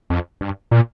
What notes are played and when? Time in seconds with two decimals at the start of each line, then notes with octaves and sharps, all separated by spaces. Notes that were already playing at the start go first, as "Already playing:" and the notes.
0.10 F2
0.41 G2
0.71 A#2